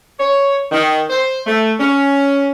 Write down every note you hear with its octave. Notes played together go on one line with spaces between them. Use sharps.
C#5
D#3
C5
A3
C#4